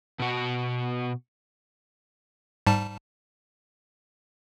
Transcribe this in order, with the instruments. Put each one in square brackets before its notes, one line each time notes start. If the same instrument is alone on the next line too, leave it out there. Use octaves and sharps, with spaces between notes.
[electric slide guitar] B2 F#4
[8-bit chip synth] G#2 G3 A5